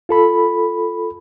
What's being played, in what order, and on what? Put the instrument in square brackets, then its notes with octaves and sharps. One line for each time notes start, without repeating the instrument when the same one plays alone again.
[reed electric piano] F4 A4 B5